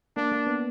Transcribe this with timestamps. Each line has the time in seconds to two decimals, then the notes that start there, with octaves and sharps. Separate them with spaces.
0.17 A#3 D4
0.32 A#3
0.47 B3